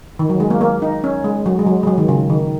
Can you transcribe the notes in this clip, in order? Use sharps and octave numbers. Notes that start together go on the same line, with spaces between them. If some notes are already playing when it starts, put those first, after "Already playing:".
D#3
F#3
G#3
A#3
A#3
D#4
C#4
G#3
F#3
G#3
F#3
G#3
F#3
D#3
C#3
D#3